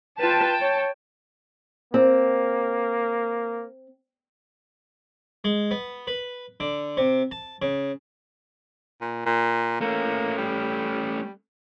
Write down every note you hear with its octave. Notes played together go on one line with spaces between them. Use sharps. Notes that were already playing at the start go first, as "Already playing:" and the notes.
F4 B4 G5 A5
C#5
A#3 C4
G#3
B3
B4
D3
C3
A5
C#3
A#2
A#2
A3 A#3 C#4
G3